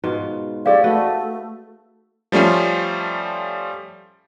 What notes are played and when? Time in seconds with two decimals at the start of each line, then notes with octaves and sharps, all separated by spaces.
0.04 G#2 B2 F4
0.66 C4 G4 G#4 C#5 D5 F5
0.84 A3 F#4 B4 D#5
2.32 F3 G3 A3 C#4 F4